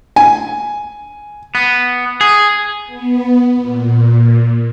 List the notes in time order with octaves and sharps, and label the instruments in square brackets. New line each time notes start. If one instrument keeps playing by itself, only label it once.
[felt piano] G#5
[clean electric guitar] B3
G#4
[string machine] B3
A#2